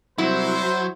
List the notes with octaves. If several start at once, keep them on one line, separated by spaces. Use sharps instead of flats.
C2 F#3 E4 C5